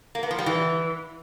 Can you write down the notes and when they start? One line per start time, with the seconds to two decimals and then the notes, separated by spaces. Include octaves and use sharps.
0.15 A#3
0.23 B3
0.31 F3
0.38 G3
0.46 E3